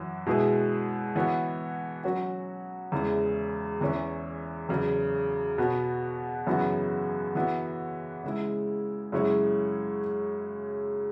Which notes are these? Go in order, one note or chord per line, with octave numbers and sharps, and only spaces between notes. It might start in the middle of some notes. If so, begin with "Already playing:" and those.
Already playing: F#2 E3 F#4
B2 G#3 E4 G#4 B4
E3 B3 F#4 C#5
F#3 C#4 F#4
E2 C#3 E3 G#3
E2 E3 C#4
E2 C#3 F#3
B2 B3 F#4
F#2 C#3 E3 B3 F#4
E3 B3 F#4
C#3 G#3 E4
F#2 C#3 G#3 E4 C#5